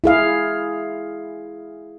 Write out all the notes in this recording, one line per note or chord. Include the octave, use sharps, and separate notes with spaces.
E4 G#4 F5